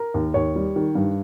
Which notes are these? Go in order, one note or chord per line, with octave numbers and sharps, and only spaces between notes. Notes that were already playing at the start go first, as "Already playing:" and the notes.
Already playing: A#4
D#2
D#2 C#5
G3
D#3
G2